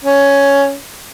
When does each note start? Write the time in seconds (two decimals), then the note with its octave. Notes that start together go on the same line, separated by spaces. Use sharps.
0.04 C#4